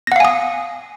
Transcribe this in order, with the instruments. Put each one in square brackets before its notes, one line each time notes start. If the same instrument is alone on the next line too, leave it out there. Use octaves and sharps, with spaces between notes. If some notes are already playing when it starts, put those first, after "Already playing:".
[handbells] A#6
F#5
F5
G#5
D#6